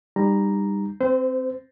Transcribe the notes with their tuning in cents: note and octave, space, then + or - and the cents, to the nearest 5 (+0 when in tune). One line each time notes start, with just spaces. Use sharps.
G3 +20 D#4 -25 A#5 +0
C4 +0 C5 -30